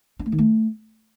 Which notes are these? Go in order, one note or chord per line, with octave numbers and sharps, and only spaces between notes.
D4
A3
D#3
A3